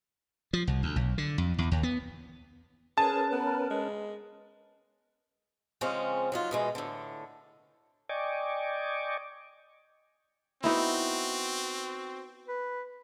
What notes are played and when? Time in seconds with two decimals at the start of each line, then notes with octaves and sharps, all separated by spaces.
0.53 F3
0.67 C2
0.83 D2
0.96 B1
1.18 D3
1.38 F2
1.58 E2
1.72 D#2
1.83 B3
2.98 C#4 G#4 A#4 B4 A5
3.32 B3
3.70 G#3
5.81 C#3 F3 G#3 C4 C#4
6.32 F#3 D#4 F4
6.51 B2 E3 G#3
6.75 A2 D3
8.09 D5 D#5 G5 G#5 C#6 D6
10.64 B3 C4 D#4 E4 F#4
12.48 B4